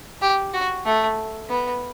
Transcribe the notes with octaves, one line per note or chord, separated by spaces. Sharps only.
G4
F#4
A3
B3